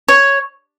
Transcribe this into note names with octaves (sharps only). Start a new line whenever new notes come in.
C#5